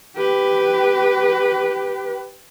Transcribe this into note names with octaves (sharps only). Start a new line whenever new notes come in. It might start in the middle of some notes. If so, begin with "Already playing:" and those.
G4 B4